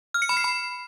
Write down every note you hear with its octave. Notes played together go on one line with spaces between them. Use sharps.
F6
C#7
B5
C7
B5